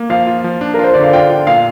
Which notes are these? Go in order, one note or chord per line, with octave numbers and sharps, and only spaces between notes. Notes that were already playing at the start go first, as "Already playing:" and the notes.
Already playing: A#3
F3 F5
F4
F3
D4
A#4
F4 C5
D3 D5
F5
F4 G5
F4
A#2 F5